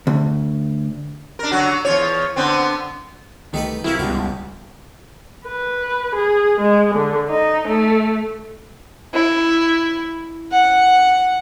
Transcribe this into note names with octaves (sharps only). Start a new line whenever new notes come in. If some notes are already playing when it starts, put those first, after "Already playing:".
D2
D4 A#4
D3 F#3 F#4
E2 F4 C#5
D3 B3 C4
C2 D#3 A3 D#4 G4 B4
C3 F#3 E4 A#4 F5
C#2 G2 B2 G3 F#4 G4
B4
G#4
G#3
D3
D#4
A3
E4
F#5